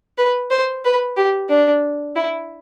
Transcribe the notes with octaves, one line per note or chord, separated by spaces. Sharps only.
B4
C5
B4
G4
D4
E4